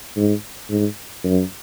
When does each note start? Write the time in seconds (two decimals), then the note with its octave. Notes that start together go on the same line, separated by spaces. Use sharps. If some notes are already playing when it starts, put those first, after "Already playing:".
0.16 G#2
0.70 G#2
1.24 F#2